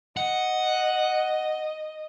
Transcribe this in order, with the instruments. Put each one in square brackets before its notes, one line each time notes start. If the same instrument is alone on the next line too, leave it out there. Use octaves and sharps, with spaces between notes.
[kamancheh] D#5 [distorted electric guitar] F#5